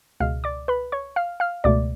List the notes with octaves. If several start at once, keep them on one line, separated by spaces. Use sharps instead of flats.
C#2 B2 G#3 F5 F6
D5 D6
B4 B5
C#5 C#6
F5 F6
F5 F6
C#2 B2 A3 D5 D6